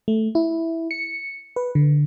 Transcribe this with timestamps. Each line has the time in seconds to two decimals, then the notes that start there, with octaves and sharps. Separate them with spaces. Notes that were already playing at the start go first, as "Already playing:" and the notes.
0.08 A3
0.35 E4
0.91 C#7
1.56 B4
1.75 D3